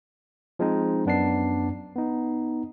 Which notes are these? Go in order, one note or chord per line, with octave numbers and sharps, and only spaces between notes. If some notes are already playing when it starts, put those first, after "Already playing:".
F3 G#3 C4 D#4
F#2 B3 D4 A5 C7
B3 D#4